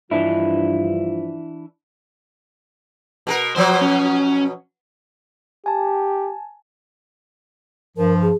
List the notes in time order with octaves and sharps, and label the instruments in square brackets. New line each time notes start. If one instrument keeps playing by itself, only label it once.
[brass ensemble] G2 F3 F4 [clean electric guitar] E3 D4 E4
[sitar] B2 G#4 A#4
[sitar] B2 F3 F#3 [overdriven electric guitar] C5
[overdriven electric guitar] C#4
[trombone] G4 [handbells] G#5 A5
[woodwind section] G2 F3 [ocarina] A#4
[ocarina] G#4